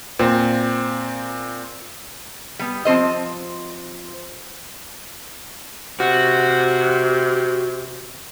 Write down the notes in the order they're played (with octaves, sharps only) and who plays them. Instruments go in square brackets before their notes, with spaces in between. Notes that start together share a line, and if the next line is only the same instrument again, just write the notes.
[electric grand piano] A#2 [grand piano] C4
[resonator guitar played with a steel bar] G3 B3
F3 C4 C5 D#5
[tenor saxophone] C3 [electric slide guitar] F#4